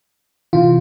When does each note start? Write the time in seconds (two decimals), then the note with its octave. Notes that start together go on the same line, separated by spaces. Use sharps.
0.53 C3 E3 F4